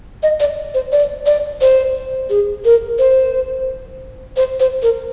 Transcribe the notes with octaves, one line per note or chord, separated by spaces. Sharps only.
D#5
D5
C5
D5
D5
C5
G#4
A#4
C5
C5
C5
A#4